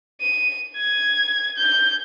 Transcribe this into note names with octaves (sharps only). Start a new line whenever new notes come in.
D#7
G#6
G6